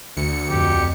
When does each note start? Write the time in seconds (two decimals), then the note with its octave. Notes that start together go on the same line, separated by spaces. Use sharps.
0.17 D2 C#7
0.50 F2 G4